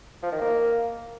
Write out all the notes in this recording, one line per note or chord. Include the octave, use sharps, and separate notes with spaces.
F3
D#3
A#3